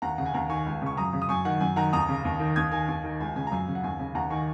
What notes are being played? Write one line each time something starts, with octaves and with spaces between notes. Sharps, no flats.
D#2 F#5 A#5
C#3 F#5
G#5
D#2 F#5 A#5
D#3 G#5 C#6
C#2
C#3 C#6
F#2 A#5 D#6
C#3
D#6
F#2 G#5 C#6
D#3 F#5
F#2 G#5
D#3 F#5 A#5
D#2 A#5 D#6
C#3
D#2
D#3
D#2 D#6 G#6
D#3 G#5
D#2
D#3
C#2 G#5
C#3 G#5
A#5
F#2 G#5
C#3
F#5
D#2 G#5
C#3
D#2 F#5 A#5
D#3 G#5 C#6